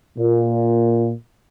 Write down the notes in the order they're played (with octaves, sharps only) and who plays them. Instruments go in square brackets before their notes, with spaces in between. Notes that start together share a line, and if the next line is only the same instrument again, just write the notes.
[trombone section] A#2